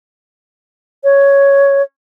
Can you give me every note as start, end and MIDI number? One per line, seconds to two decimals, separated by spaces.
1.04 1.82 73